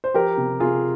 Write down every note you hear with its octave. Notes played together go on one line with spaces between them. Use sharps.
C5
F3 G4 A#4
C3
C3 F4 G#4